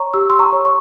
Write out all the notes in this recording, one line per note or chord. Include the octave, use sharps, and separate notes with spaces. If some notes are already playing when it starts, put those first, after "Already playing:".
Already playing: C#5 A#5 C#6
G4 E6
C6 E6
A#5 C#6
C#5
C#6